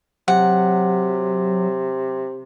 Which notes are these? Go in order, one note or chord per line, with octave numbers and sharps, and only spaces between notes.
C3 F#3 F#5